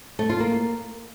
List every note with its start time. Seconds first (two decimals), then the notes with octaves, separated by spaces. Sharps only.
0.19 A3
0.29 F4
0.40 A#3